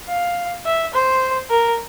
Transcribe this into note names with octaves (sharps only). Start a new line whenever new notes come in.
F5
E5
C5
A#4